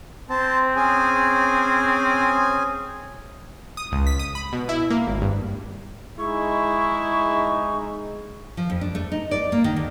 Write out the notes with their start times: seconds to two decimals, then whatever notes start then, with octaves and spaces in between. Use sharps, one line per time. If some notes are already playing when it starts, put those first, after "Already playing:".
0.30 C4 C5 A5
0.76 C#4 G#4 G#5
3.77 D#6
3.92 C#2
4.07 B6
4.19 D#6
4.35 B5
4.53 B2
4.69 E4
4.90 A#3
5.07 G#1
5.22 G2
6.19 G#3 D#4 E4 C#6
8.57 F3
8.70 F2
8.81 D4
8.95 A3
9.12 D#4
9.31 D5
9.52 A#3
9.64 D#3
9.76 D2